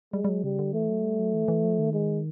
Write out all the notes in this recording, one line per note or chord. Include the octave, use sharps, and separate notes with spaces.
G3 G#3
G3
F#3
C#3 G3
D3
E3 A3
F#3
G3
F#3
E3
E3
F3
D#3
G#3